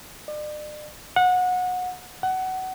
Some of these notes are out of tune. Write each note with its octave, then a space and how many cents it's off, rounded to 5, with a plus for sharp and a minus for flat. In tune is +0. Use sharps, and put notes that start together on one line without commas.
D5 +40
F#5 -25
F#5 +20